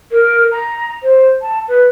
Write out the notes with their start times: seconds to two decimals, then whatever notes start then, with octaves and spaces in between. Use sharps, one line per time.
0.11 A#4
0.51 A#5
1.03 C5
1.42 A5
1.68 B4